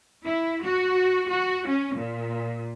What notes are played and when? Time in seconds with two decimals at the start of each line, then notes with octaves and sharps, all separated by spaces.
0.24 E4
0.63 F#4
1.29 F#4
1.67 C#4
1.95 A#2